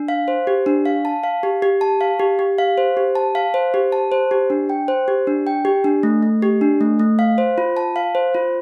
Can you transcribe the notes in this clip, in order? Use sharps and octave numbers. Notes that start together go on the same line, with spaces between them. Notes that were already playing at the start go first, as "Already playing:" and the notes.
Already playing: D4
F5
C5
G4
D4
F5
A5
F5
G4
G4
A5
F5
G4
G4
F5
C5
G4
A5
F5
C5
G4
A5
C5
G4
D4
G5
C5
G4
D4
G5
G4
D4
A3
A3
G4
D4
A3
A3
F5
C5
F4
A5
F5
C5
F4